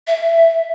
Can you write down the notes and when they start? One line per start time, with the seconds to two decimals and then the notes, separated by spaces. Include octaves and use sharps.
0.07 E5